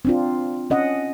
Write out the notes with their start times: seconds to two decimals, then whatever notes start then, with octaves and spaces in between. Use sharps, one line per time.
0.05 C4 D4 F4
0.70 C#4 D#5 F#5